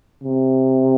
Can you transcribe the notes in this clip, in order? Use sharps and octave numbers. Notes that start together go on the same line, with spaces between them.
C3